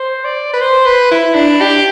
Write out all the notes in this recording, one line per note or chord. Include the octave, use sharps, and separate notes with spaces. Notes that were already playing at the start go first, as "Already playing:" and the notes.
Already playing: C5
D5
B4
C5
B4
E4
D4
G4